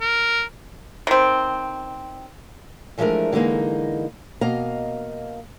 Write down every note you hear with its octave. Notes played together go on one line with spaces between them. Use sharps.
A#4
D#3 C4
E3 F3 G#3 A3 D4 A#4
D3 E3 G#3 A#3 D#4
B2 A#3 D#5 F5 A#5